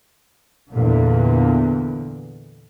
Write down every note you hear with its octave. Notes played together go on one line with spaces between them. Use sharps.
E2 A#2 D3